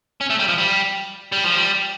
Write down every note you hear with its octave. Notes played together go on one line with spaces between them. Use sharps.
C#4
A3
G3
F3
G3
G3
F3
G3